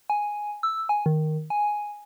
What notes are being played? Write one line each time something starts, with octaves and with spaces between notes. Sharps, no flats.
G#5
E6
G#5
D#3
G#5